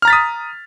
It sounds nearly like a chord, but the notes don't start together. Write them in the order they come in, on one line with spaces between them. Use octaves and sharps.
F6 A#5 A6 B6 D#6